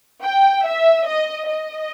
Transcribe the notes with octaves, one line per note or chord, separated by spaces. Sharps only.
G5
E5
D#5
D#5